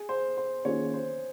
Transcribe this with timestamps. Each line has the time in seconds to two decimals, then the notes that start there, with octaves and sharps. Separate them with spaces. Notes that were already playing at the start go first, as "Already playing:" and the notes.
Already playing: G#4
0.09 C5
0.37 C5
0.65 D#3 A#3 C#4 F4 G#4 C#5
0.94 C5